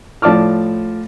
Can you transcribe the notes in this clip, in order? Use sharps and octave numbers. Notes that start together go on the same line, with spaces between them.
A2 F3 D5 A5 D6 F6